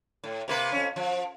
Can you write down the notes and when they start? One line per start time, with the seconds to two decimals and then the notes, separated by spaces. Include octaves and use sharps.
0.24 A2
0.48 C3 A#3 B4
0.72 F2 C#4
0.96 F3